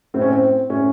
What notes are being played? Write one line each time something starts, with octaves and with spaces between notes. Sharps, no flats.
A2 C4
C#4
C4
A2 C#4